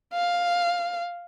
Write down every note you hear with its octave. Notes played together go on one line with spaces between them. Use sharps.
F5